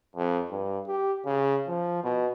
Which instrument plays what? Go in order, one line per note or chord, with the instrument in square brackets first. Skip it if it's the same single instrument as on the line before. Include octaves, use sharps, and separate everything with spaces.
[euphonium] F2
G2
G4
C#3
F3
B2